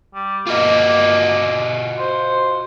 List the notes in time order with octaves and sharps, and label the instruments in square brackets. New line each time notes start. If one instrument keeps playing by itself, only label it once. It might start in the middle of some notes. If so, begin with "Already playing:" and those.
[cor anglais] G3
[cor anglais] A#3 [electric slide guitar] F4 F#4 D#5
[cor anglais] C5